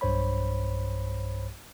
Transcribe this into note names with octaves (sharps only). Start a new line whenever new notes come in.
B1 G2 C5 C#5 B5